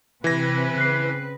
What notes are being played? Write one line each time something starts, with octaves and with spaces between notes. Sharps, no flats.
C3 E3 C4 B4 G#6 A#6
C#3 F#6 C7